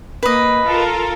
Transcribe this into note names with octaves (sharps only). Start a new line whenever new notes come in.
A#3 B4 D#5
F4 A4 A#4